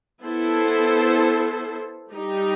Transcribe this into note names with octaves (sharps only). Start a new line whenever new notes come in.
B3 E4 A4 C5
G3 D#4 G4